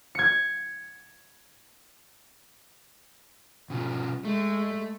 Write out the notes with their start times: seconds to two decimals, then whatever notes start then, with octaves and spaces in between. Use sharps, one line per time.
0.15 G#6 C#7
3.70 B2 C#4 F4
4.25 G#3 A3